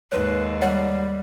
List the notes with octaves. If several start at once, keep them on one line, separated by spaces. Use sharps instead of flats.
D#2 G#2 B4 C#5
G3 C#5 F#5